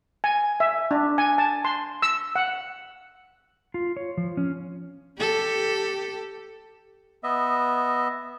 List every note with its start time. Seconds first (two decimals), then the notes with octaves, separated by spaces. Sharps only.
0.24 G#5
0.60 E5
0.91 D4
1.18 G#5
1.38 A5
1.65 C6
2.02 E6
2.36 F#5
3.74 F4
3.97 C#5
4.17 F3
4.37 C#4
5.18 G4 A4
7.24 B3 D#5 E5